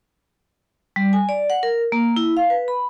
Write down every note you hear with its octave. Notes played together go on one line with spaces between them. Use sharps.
G3
G#5
D5
F#5
A#4
A#3
E4
F5
B4
B5